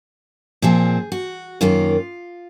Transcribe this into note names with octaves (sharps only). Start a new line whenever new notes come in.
A#2 F3 C4 G#4
F#4
F#2 D#3 A#3 F4